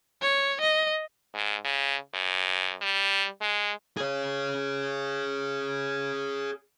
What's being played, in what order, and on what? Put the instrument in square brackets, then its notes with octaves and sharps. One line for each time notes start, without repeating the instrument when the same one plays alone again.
[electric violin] C#5
D#5
[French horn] G#2
C#3
F#2
G3
G#3
[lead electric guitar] G#4 C#5